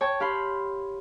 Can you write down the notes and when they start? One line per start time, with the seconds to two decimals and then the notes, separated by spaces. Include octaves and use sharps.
0.01 C#5 G5 A5 C#6
0.20 G4 F5 B5 C6